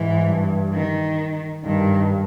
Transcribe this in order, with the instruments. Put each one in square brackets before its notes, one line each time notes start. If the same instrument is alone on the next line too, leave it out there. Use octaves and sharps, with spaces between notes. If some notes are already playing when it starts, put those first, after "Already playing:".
Already playing: [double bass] G#2 [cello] E3
[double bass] G2
[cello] D#3
[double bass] G2 [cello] D#3